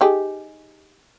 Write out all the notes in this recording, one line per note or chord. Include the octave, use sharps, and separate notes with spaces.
D#4 G4 G#4